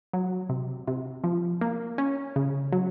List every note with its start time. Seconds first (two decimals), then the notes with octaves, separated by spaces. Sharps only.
0.13 F#3
0.49 C3
0.88 C3
1.24 F3
1.61 A#3
1.98 C#4
2.36 C#3
2.73 F#3